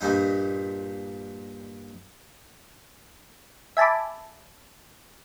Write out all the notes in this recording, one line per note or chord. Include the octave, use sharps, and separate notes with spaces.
G2 A#2 G3 D#4
E5 G#5 A5 B5 D6